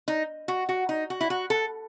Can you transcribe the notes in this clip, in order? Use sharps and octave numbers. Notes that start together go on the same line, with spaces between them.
D#4
F#4
F#4
D#4
F#4
E4
F#4
A4